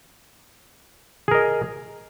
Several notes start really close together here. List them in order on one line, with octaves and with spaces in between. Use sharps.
G#4 A#4 D#5